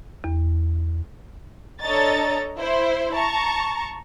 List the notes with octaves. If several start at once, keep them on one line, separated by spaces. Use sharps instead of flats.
E2
D4 A4 C#5 D#5 A#5 A6
E4 C5
A5 A#5 C#6